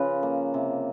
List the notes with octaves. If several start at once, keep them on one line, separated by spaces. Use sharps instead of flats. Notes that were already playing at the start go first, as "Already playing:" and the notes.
Already playing: C#3 F3 B4
A#3
C3